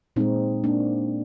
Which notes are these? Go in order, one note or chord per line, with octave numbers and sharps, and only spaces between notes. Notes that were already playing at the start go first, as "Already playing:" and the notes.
A#2 G#3 C4 D#4
A#3 D4